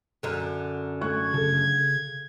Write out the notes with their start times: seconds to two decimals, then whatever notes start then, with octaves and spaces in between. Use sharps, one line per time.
0.23 F#2 D3
1.01 A3 C#6 F#6 G#6
1.34 C#3 A4